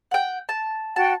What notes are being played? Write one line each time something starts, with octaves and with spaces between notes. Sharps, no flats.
F#5 G5
A5
F#4 F#5 G5 A5